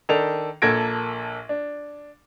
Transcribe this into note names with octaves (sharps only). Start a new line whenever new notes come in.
D#3 D4 A4 F7
A#1 A#3 A4 G#6 A#6 D7
D4